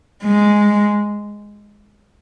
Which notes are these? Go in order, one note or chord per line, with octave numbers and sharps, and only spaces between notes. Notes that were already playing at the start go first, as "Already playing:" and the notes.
G#3